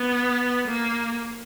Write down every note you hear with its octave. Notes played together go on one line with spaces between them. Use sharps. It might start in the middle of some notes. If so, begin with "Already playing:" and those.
Already playing: B3
A#3